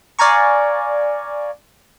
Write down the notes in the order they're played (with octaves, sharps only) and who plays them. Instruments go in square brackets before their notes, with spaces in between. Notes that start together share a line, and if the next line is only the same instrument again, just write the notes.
[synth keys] D5 F5 G#5 A#5 C#6